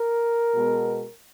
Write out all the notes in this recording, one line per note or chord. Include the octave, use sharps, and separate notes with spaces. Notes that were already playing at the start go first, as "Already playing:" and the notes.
Already playing: A#4
B2 G#3 B3